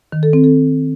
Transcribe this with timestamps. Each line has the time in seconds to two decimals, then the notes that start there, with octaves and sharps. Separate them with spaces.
0.12 D#3
0.23 A4
0.33 C4
0.44 A4